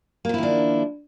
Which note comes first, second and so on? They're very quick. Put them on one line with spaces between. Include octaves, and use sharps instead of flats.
A#3 F3 E4 D#3 D4